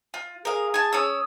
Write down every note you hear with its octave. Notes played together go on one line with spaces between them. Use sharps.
F4
G#4 A#4 F5
G#5 A5
C#4 D#6 E6